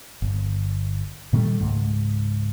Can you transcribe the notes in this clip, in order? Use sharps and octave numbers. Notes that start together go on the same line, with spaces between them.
G1
A#2 D#3 G3 A3
C#2 G#2